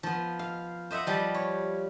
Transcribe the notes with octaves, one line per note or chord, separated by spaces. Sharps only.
F3 B3
F5
C5 D#5 E5 F#5
F3 G3 B4 F#5
C#5